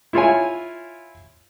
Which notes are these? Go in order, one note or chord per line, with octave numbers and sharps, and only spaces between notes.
E4 F4 C#5 G#5